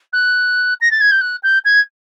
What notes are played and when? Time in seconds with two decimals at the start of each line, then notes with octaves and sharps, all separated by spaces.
0.13 F#6
0.81 A#6
0.91 A6
1.01 G#6
1.11 G6
1.21 F#6
1.43 G6
1.65 G#6